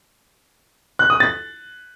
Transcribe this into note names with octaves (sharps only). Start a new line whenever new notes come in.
F#6
D#6
A6